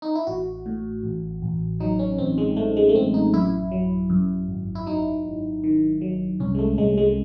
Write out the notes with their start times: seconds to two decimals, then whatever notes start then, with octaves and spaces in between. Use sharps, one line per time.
0.02 D#4
0.15 E4
0.27 A1 F#4
0.66 A2
1.03 A1
1.42 A1
1.80 F#3 D#4
1.99 C#4
2.18 A1 C4
2.38 G#3
2.57 A2 A3
2.77 G#3
2.89 A3
2.95 A1 C4
3.14 D#4
3.34 F#2 E4
3.71 F#3
4.10 F#2
4.48 G#1
4.75 E4
4.86 F#3 D#4
5.25 G#1
5.64 D#3
6.01 F#3
6.40 C2 C#4
6.55 G#3
6.59 A3
6.78 C2 G#3
6.98 G#3